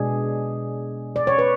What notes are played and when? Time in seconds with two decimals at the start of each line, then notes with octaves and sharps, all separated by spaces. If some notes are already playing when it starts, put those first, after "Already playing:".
Already playing: B2 G#3 D4 G#4
1.16 D5
1.27 C#5
1.39 B4